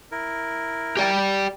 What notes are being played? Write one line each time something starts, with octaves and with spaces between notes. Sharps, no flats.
E4 A#4
G4 D5 G5